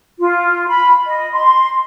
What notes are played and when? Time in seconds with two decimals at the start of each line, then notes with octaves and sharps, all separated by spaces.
0.19 F4
0.67 B5
1.06 D#5
1.32 C6